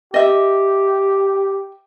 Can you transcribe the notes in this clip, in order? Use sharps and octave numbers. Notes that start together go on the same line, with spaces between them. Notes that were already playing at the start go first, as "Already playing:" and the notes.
G4 D#5 E5